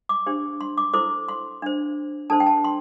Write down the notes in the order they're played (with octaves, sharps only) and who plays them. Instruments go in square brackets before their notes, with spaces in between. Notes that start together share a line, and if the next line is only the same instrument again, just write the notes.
[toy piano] D6
D4 G4 C5
C6
D6
E4 A4 C5 D6
C6
D4 C5
D4 A4 C5 A5
G5
A5
C6